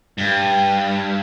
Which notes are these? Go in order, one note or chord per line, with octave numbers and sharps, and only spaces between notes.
G2